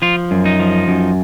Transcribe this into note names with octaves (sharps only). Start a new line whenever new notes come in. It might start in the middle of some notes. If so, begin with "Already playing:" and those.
F3 F4
F#2
D#4
F3
F#2